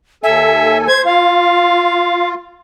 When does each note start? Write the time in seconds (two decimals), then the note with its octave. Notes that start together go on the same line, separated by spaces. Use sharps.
0.23 D#2 A4 E5 G#5
0.87 C5 G#6
1.05 F4 F5